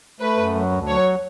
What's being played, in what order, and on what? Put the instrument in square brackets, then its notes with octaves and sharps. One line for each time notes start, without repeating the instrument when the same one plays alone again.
[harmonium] A3 [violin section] B4
[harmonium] F#2
F#3
D2
[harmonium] F#3 [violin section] C#5